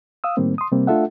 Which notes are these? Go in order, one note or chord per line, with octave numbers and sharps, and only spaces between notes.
F5 D#6 E6
A2 D#3 G3 A#3 C4
C6 D#6
C3 G3 A#3 C4
A3 D4 F4 A4 E5 F#5